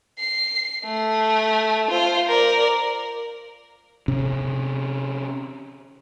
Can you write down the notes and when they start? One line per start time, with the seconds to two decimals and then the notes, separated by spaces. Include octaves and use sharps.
0.19 C7
0.86 A3
1.90 F4 C5
2.28 A#4 D5
4.08 C3 C#4